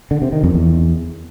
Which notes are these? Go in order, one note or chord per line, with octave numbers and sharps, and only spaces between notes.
D3
C3
D#3
F2
E2